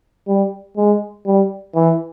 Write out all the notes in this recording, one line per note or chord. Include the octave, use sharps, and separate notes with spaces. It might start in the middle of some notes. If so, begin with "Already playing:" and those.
G3
G#3
G3
E3